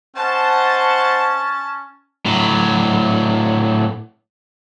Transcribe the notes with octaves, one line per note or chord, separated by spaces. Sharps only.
C#4 C5 D#5 F#5 A5
A2 F#3